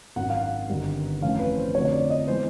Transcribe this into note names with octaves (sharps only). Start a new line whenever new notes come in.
G#1 F#2 D#3 F#3 F#5
F5
F#5
G1 G2 D#3 G3
F2 C3 E3 A3 C#4 F5
B4
C5
F2 D3 F3 A3 C#5
C#5
D5
D#5
E3 G#3 B3 C5